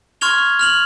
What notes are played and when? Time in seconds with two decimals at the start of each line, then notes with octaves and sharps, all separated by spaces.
0.21 C6 C#6 F6 G#6 F7 G7
0.59 F6 F7 F#7